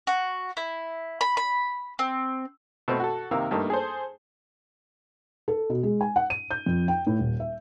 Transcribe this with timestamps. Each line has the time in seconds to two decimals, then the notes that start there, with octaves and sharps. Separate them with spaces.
0.07 F#4
0.57 E4
1.21 B5
1.37 B5
1.99 C4
2.88 B2 A3 C4
3.00 F#4 A4
3.31 C3 D#3 A#3 A#4 F5 E6
3.51 G2 A3 A#3 D#4
3.70 G#4 A4 C5
5.48 A4
5.70 B2
5.83 G#3
6.01 G#5
6.16 F#5
6.30 D#7
6.51 G6
6.66 F2
6.88 G5
7.07 A2
7.19 D#1
7.40 E5